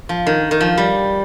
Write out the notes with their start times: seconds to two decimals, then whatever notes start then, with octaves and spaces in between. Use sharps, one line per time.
0.09 F3
0.26 D#3
0.51 D#3
0.61 F3
0.77 G3